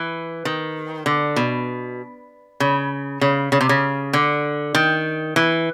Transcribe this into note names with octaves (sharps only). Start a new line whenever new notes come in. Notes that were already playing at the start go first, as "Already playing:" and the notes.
Already playing: E3
D#3
D3
B2
C#3
C#3
C#3
C3
C#3
D3
D#3
E3